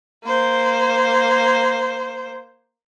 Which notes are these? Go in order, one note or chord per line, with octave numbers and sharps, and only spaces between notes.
A#3 C5